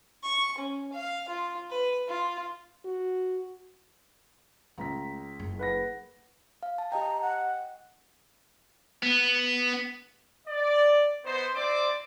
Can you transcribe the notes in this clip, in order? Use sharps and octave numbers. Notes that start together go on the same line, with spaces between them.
C#6
C#4
F5
F4
B4
F4
F#4
C#2 A3 C4 A#5 B6
F#1
B4 F#5 A#6
F5
A5
G4 D#5 G5 A#5
F#5
B3
D5
B3 D#4 C5
C4 E4 C5 D5 D6